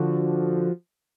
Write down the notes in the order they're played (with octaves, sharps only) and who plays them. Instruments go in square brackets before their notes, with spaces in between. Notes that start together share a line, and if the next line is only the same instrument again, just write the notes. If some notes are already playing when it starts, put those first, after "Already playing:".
Already playing: [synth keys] D3 F3 F#4